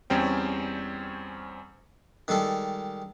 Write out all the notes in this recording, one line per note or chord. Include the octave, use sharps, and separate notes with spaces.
E2 G3 C4 C#4 G5
D#3 G3 G#3 A4